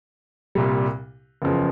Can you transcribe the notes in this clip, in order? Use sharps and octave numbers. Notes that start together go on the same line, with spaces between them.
C2 A#2 G3
F#1 E2 C#3 F3